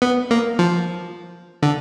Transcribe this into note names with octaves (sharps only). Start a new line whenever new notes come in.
B3
A#3
F3
D3